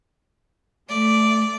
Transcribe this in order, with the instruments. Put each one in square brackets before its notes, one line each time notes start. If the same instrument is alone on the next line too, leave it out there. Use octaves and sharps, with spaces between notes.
[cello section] A3 [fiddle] D5